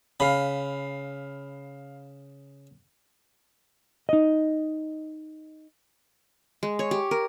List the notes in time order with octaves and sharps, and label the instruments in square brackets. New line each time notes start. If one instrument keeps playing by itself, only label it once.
[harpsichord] C#3 [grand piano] F5 B5
[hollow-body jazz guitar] D#4 D#5
[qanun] G#3
C#5
G4
A#4